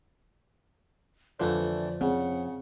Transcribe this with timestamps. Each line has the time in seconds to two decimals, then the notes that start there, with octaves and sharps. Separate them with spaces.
1.40 F2 D3 E3 F3 A3 C5 D5
2.01 C#3 C4 G#4 F#5